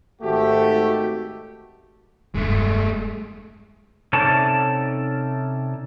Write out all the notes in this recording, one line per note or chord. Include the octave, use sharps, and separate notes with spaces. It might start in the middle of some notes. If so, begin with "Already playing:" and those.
G#1 A3 F#4 G4
E1 G2 G#3 A3
C3 C#4 D#4 A4 D5 A5